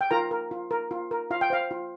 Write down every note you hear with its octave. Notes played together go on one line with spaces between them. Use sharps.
G5
F4 A#4 A#5
A#4
F4
A#4
F4
A#4
F4 F5
G5
C5 F5
F4